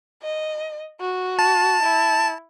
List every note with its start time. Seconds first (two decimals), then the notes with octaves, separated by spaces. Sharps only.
0.23 D#5
1.01 F#4
1.39 A5
1.83 E4